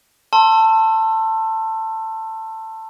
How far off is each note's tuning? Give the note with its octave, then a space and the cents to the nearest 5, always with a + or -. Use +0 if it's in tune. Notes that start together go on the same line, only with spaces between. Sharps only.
A5 +15 C6 +25 E6 +20